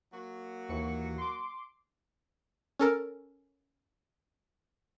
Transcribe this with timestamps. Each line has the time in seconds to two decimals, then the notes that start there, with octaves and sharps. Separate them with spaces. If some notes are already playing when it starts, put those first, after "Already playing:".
0.13 F#3 A#3 F#4
0.69 D#2 E3 C#7
1.18 C6 D6
2.79 C#4 A4 A#4